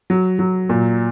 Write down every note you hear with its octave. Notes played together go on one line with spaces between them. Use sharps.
F#3
F#3
A#2